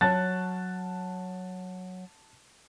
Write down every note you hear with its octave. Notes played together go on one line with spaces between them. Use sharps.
F#3 C#5 A5 F#6 A6